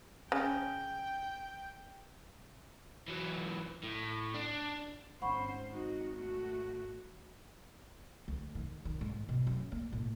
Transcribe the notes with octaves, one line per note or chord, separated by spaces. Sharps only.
C#3 G5
E3 F#3
A2
D4
G#1 C#4 C5 F#5 B5 C#6
D#4 F#4
A3 F#4
D2
D#3
D#3
G#2
B2
F#2
A#3
A2